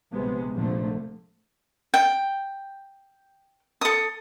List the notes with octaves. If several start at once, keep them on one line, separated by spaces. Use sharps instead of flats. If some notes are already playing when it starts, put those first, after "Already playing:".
A#1 C3 G#3 B3
F1 A#1 A#2 D3 F3 A3
G5
A4 D#6